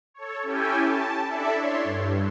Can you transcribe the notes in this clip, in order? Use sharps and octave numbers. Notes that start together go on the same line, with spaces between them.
A4 C#5
C#4 E4 G4 A4 G5 G#5
A5
D4 E4 A4 D5 E5
C#5 C6
G2